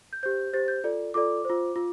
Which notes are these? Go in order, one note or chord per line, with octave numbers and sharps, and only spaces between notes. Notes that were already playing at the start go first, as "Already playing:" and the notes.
G6
G4 C5 G6
G4 C5 A6
G6
F4 A4 D5
F4 A4 D5 D6
F4 C5
F4